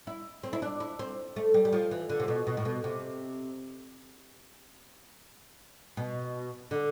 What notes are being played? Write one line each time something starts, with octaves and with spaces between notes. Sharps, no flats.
E4
C4
E4
D4
E4
C4
A3
G3
G3
F3
E3
D3
C3
B2
B2
A2
B2
C3
B2
D3